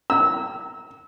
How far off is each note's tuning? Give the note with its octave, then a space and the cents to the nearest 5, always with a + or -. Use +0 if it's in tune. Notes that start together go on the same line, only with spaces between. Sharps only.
E6 -25